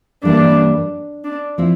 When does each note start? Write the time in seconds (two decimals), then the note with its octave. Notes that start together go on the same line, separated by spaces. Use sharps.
0.23 G2 E3 G3 A#3 D4
1.24 D4
1.58 F3 C4 E4